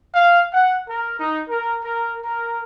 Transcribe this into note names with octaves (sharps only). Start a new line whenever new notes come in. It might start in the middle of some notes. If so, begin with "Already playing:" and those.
F5
F#5
A#4
D#4
A#4
A#4
A#4